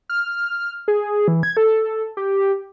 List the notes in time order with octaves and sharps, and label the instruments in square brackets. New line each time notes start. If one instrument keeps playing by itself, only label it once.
[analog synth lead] F6
G#4
E3
G#6
A4
G4